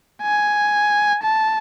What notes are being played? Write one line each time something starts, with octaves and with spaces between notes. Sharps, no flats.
G#5
A5